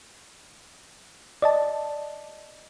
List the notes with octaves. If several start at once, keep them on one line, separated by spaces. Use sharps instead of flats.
D5 D#5 A5